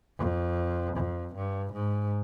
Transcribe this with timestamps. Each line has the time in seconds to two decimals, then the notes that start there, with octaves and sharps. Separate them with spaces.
0.18 F2
0.96 F2
1.35 G2
1.73 G#2